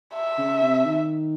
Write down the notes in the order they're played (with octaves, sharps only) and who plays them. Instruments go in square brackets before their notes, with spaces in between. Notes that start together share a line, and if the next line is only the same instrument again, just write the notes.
[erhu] E5
[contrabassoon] C#3
C3
D#3